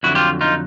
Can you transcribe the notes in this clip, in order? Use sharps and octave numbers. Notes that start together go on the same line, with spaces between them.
F2 D3 F#3 E4 F#4
F4 G4
D#4 F4